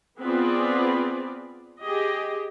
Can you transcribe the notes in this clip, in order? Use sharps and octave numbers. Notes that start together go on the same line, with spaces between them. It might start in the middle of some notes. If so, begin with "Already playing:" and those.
B3 C4 F4 G#4 B4 D5
G4 G#4 D#5